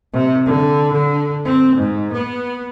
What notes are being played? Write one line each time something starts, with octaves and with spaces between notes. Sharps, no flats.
C3
D3
D3
C4
G#2
B3